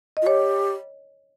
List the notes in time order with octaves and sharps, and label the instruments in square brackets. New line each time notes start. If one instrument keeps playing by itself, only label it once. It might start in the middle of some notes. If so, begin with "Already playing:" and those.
[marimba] D#5
[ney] F4
[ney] G4 [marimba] C#5